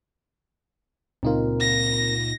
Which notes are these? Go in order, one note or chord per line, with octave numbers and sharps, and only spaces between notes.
C#2 A#2 G#3 C4 D#4 F4 A#4
A#6